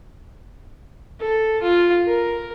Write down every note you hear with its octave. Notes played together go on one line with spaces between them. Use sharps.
A4
F4
A#4